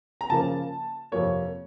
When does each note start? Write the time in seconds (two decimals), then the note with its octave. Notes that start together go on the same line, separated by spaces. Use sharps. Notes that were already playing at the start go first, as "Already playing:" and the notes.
0.21 A#5
0.30 C#3 F3 A#3 A5
1.12 F2 C3 F3 A#3 C#5